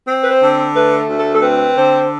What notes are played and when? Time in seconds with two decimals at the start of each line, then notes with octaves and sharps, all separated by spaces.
0.07 C4
0.23 B4
0.30 C5
0.41 D3
0.75 A3 B4
1.08 D2
1.20 A4
1.33 A4
1.42 C4 B4
1.76 D3 C5